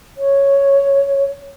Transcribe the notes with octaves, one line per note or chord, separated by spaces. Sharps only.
C#5